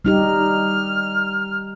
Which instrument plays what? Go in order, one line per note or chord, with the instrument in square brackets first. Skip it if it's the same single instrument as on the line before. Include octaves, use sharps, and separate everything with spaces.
[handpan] G3 D#4 G4 [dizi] F6